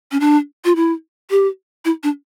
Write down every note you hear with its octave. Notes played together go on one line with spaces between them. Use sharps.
C#4
D4
F4
E4
G4
E4
D4